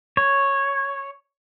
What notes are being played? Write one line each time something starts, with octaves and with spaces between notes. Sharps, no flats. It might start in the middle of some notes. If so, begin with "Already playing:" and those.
C#5